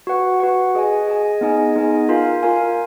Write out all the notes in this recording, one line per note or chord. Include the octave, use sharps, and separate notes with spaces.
F#4 B4 F#5
F#4 B4 F#5
G#4 D#5 G#5
G#4 D#5 G#5
B3 D#4 G#4 D#5 G#5
B3 D#4 G#4 D#5 G#5
F4 A#4 F5 G#5
F4 A#4 F5 G#5